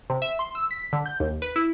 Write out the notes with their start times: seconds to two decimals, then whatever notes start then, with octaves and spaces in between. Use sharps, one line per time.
0.10 C3
0.22 E5
0.39 C6
0.55 E6
0.71 B6
0.93 D3
1.06 G6
1.20 D#2
1.42 B4
1.56 E4